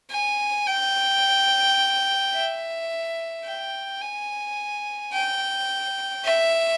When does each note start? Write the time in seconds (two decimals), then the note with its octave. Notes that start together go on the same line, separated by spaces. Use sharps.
0.11 G#5
0.67 G5
2.34 E5
3.46 G5
4.02 G#5
5.14 G5
6.25 E5